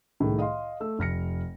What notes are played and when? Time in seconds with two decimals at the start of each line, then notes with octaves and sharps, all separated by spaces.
0.20 C2 A2 D#3 G#3
0.39 D#5 F5 C6
0.80 A3 E6
0.99 F1 F6 A#6 C#7